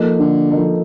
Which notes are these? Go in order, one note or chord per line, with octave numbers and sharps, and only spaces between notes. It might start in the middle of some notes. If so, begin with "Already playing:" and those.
Already playing: F3 A#3 D#4 A4
D3
F3 A#3 D#4 A4